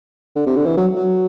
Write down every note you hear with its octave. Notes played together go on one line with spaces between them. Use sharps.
D3
C3
D3
E3
F#3
F#3